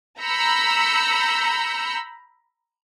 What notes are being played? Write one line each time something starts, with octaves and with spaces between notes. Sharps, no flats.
A#5 B5 E6 G6 C#7